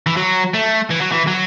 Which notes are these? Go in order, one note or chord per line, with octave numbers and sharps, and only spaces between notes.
E3
F#3
A3
E3
F#3
E3
F#3